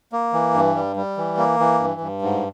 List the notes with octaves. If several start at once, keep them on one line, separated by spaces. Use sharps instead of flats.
A#3
E3
G2
G3
G3
E3
A#3
E3
G2
G2
G#2